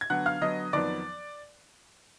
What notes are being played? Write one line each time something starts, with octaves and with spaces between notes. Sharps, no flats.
G#6
D3 F#3 B3 F#5 F#6
F5 F6
D3 F#3 B3 D#5 D#6
F2 D#3 F#3 B3 D5 D6